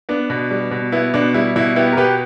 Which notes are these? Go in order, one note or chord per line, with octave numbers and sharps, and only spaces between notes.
B3 D4
B2
G3
B2
B3 E4
B2 D4
G3 E4
B2 E4
B3 E4 G4
A#4
B2 G4 B4